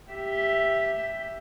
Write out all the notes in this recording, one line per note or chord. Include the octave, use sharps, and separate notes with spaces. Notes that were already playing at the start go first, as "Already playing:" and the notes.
G4 E5